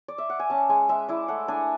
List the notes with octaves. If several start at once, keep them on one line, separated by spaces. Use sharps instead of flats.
D5
E5
F#5
G#5
C#4 A5
G#3 G#5
G#3 E5
E4 D5
A3 F#5
D4 G#5